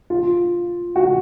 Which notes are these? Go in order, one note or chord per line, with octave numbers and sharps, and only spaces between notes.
F4
F#4